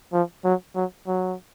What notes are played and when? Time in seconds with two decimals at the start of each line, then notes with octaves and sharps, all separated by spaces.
0.13 F3
0.44 F#3
0.76 F#3
1.07 F#3